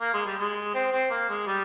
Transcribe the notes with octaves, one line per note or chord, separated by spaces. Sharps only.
A#3
G#3
G3
G#3
C4
C4
A#3
G#3
G3